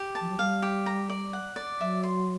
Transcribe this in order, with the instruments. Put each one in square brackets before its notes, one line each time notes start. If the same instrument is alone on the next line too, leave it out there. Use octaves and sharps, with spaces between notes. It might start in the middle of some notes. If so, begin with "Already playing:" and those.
Already playing: [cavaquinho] G4
A5
[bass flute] F3
F#3
[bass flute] G3 [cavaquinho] F5
[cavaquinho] G4
A#5
D5
F#5
D5
[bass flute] F#3 [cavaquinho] E5
[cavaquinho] C6